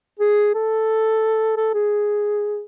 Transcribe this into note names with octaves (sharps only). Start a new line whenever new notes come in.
G#4
A4
A4
G#4